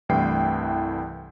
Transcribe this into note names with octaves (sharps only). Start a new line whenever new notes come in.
C2 G2 E3 A3 G5 C7